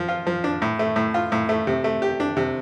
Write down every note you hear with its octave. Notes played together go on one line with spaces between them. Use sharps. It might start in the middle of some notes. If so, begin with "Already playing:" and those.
Already playing: F3
F4
F3
D4
A2
A3
A2
F4
A2
A3
C3
A3
G4
D4
C3